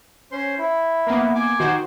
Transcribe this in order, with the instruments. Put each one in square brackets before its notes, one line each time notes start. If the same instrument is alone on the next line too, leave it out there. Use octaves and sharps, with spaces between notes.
[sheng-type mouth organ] C#4 C5 C6
E4
[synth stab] A#3 B3
[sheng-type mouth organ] G#5 D6
[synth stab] D#3 F#4 C5